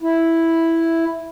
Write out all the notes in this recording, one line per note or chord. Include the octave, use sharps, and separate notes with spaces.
E4